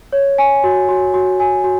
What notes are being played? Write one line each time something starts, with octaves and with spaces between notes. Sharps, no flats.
C#5
G#5
F#4
F#4
F#4
G#5
F#4